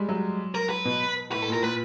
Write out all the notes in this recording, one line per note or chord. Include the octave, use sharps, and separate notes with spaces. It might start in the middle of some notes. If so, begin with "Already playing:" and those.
Already playing: G3 G#3
F#3
A#4
B4
B2
A2 B4
A4
A#2
A#4
A#2 B4